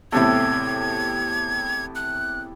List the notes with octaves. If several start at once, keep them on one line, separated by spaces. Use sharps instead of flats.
E2 A2 C3 E4 G4 A4 G#6
F#6